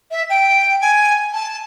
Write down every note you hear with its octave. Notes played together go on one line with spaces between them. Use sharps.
E5
G5
G#5
A5